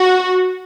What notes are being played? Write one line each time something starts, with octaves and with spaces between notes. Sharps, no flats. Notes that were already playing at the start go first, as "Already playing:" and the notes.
Already playing: F#4